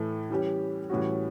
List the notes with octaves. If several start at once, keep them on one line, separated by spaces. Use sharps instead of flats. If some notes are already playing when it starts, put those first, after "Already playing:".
Already playing: A2 E3 A3 E4
E3 G3 C#4 G4
A2 E3 G3 C#4 F#4